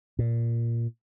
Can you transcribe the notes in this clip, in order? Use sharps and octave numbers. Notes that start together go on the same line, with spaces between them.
A#2